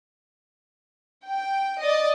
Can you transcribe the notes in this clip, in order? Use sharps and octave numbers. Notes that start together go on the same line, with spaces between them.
G5
D5 D#5